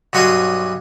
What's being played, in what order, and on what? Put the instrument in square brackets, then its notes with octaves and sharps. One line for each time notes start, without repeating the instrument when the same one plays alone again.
[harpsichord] B1 G2 F#4 C#5 C6 D#6